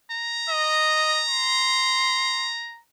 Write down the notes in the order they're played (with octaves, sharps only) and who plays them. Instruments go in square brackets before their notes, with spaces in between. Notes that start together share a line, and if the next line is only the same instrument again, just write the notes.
[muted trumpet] A#5
[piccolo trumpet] D#5
C6